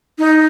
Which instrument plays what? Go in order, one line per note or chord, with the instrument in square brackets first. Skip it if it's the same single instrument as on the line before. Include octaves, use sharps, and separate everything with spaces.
[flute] D#4